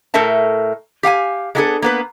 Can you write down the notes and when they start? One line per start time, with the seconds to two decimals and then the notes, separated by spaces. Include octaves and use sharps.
0.14 A2 A3 A4 A#4 E5 A5
1.03 G4 F5 G5 G#5
1.55 G#3 A#3 B3 D4 G#4 A4
1.82 A#3 B3 B4